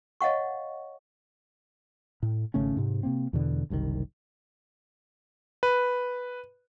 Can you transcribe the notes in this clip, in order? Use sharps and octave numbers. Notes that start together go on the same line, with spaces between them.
C#5 D#5 F5 F#5 C#6
A2
G#1 C#3 A3 C#4
G#2 C3
C3 A#3 C4
E2 B2 D3
F#1 C2 A#2 D#3
B4